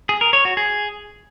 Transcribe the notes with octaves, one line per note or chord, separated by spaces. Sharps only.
G#4
A#4
C#5
F#4
G#4